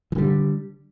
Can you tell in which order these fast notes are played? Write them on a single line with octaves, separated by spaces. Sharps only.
E3 D3 G3